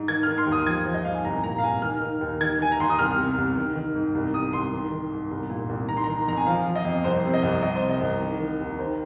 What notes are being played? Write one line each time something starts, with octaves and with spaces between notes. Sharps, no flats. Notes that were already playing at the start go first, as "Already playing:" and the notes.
Already playing: G#2
D#3 G#6
D#3 F6
C6
D#2
D#6
F3 G#6
F3 C5
D#5
G#2 F5
G#5
C2 A#5
A#2 A#5
F5
C2 G#5
D#3 F6
D#3
D#2
D#3 G#6
D#3 G#5
A#5
D#2 C6
D#6
C2 F6
C3
C2
D#3
D#3
G#2
C2
C3 D#6
C2 C6
D#3
D#3
G#2
C2
A#2
C2
D#3 A#5
C6
D#3 A#5
F2 A#5
G#5
F3 F5
F3
D#5
F2
C2 C5
C3
D#5
C2
C2 D#5
C5
C3
D#5
C2
D#3
D#3
D#2
D#3 C5